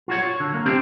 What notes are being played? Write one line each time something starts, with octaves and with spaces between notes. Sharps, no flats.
F4 F#4 C#5
C#5
D3
A#3
C4 D4 G4 C5